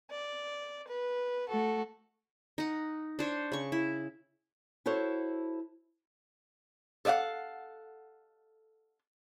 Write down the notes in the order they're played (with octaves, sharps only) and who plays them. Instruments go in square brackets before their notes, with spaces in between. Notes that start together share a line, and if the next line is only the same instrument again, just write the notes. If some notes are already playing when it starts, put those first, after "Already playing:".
[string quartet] D5
B4
A3 F#4 A4
[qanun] D#4 F#5
D4 C5 C#5
C#3 C#6
E4
[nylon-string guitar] E4 F#4 A4 C5 C#5
[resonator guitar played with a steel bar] A4 C#5 D5 F5 F#5